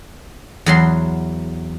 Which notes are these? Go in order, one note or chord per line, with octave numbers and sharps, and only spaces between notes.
E2 F#3 C6